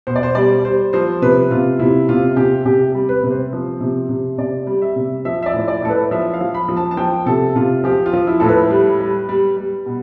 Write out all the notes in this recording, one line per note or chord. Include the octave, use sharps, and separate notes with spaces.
B2 C5
D5
C5
G3 D5
G3 C5
F3 C5
C3 B4
C3 F4
C3 E4
C3 F4
C3 G4
C3 G4
G3
B4
C3
C5
F3
C3
C3
C3 D5
G3
E5
C3
F3 E5
E5
D5
A2
D5
A2 A4
B4
F3 E5
F5
F3
B5
F3
A5
A5
F3 G5
C3 A4
C3 F4
F3 G4
F4
F3
E4
A2 A4
B4
G3
G3
G3
G3
B2